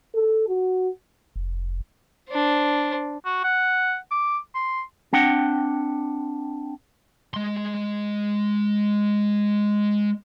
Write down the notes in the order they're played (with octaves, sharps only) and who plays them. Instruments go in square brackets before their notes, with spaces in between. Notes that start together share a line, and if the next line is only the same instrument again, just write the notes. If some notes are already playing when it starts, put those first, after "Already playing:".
[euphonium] A4
F#4
[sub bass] F1
[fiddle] D4 C5
[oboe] F#4
F#5
D6
C6
[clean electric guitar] C4 D4 F#5 G5
[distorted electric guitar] G#3 C6